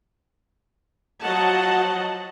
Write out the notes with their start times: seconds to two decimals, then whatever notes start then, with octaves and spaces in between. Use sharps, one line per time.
1.22 F3 F#3 F#4 D#5 F#5 A5